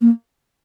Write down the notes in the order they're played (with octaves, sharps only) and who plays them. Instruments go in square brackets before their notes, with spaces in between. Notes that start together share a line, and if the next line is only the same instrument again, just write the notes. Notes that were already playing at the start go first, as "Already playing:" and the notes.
[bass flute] A#3